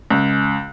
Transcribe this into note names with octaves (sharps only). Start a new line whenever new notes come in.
C#2